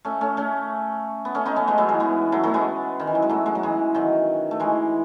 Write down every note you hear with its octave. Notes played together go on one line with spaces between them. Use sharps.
A3 C#4
A3 C#4
A3 C#4
B3
A3 C#4
B3 D#4
A3 C#4
G#3 B3
F#3 A3
E3 G#3
G#3 B3
F#3 A3
F#3 A3
G#3 B3
D#3
E3
F#3
G#3
F#3 A3
G#3
F#3
E3 G#3
D#3 F#3
A3
E3 G#3